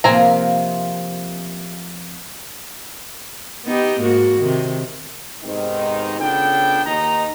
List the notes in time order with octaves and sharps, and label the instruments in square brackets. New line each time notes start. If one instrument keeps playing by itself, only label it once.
[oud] C3 F3 A#3 [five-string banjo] C4 G#5 A#5
[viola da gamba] B3 D#4 G4
G#2 A#3 F#4
C3 D#3
[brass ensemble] G#2 C3 D#3 B3 C4 D#4
C#3 B3 D4 F4 A4 G5
D#2 D#3 D#4 D#5 A#5